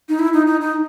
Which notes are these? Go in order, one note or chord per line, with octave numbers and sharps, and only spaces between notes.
D#4
E4
D#4
D#4
D#4